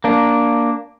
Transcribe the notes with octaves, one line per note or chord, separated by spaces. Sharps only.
A#3 D4